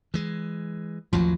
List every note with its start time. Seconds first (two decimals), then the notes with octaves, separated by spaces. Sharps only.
0.14 E3 G#3
1.13 A1 D#2 F3 F#3